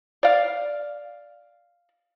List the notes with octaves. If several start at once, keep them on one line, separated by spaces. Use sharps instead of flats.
D5 F5